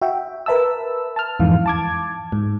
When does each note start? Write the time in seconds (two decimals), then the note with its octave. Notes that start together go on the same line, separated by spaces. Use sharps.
0.01 F#4 E5 G5
0.46 A#4 B4 E5 A5 E6
1.16 A5 F6
1.40 F2 G#2 E3 F5
1.66 A5 D6 G#6
2.32 G#2